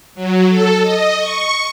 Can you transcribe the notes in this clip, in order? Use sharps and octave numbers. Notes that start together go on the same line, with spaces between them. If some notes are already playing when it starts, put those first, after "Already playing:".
F#3
A4
D#5
C#6